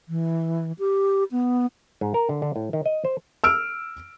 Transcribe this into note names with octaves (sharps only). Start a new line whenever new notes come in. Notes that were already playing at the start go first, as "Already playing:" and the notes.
E3
G4
B3
G#2
A#4
D3
D3
A2
D#3
D#5
C5
E6 F6 D7